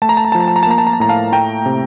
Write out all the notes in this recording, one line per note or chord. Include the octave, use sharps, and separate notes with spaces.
A3 A5
A#5
A5
A#5
F3 A5
A#5
A5
A#5
A5
A#3 A#5
A5
A#5
A5
A2 A#5
F5 A5
A3 G5 A#5
C3